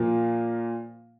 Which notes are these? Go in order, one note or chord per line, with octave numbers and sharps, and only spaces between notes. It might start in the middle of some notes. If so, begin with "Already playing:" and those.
Already playing: A#2 F3 A#3